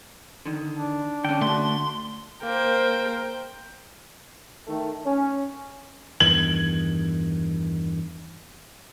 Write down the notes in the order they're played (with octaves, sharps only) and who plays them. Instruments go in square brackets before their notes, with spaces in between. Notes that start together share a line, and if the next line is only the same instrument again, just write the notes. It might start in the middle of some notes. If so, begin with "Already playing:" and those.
[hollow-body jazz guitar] D3 D#3
[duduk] D4
[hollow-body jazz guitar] D3 C#4 [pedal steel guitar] G5
[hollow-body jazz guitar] D3 [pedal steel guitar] A3 F#4 [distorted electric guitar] C6
[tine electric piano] A#3 [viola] A#4 C5 [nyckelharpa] G5
[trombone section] D#3 A3
C#4
[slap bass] E2 G2 D#3 [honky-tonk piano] G#6 F#7